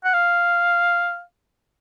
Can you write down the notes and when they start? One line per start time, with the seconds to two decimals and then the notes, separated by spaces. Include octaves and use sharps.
0.04 F#5
0.14 F5